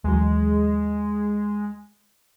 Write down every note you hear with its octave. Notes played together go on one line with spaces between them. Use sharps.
D#2 E3 F#3 G#3